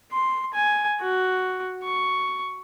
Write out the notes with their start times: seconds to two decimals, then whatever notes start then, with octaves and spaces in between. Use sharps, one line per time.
0.12 C6
0.54 G#5
1.01 F#4
1.84 C#6